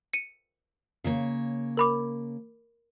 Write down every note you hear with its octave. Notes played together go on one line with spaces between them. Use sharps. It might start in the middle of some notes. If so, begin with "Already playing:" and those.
C#7 D#7
C#3 A#3 C#5
A#4 B5 D6